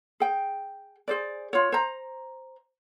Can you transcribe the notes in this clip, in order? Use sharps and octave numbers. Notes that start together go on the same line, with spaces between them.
G#4 G5
G#4 C5 D5
F4 C#5
C5 A#5